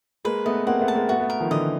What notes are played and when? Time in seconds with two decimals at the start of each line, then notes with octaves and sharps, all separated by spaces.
0.25 G#3 A#3 B4
0.45 A3 B3 D#5
0.67 A#3 C4 F#5
0.81 A3 B3
0.88 A5
0.95 G#3 A#3
1.08 A3 B3 F#4
1.20 A3 B3
1.30 A#4
1.40 D#3 F3
1.51 D3 E3 D#5